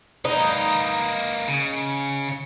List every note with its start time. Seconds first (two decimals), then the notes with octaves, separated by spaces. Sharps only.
0.25 A#3 D#4 B4
1.48 C#3